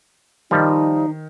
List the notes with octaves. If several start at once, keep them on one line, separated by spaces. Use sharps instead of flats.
D#3 F3 G3 D#4